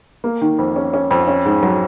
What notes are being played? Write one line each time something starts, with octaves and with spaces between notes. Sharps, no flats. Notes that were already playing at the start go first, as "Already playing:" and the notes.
A#3
D#3
F2
C#4
C#4
F2
C#4
G#2
F#3